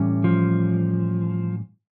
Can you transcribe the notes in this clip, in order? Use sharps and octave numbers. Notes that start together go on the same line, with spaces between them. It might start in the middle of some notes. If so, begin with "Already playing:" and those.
Already playing: A2 E3 G3 C#4
F3